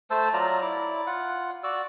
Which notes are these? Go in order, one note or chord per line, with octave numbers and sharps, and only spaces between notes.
A3 C5 A5 E6
F#3 F4 D5 A#5
E4 D5
F4 F#5
F#4 D5 E6